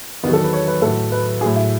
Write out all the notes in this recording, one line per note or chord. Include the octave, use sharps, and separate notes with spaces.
E2 D#3 F#3 B3
A4
B4
C#5
B4
A2 F#3 A4
B4
A2 F#3 G#4
E4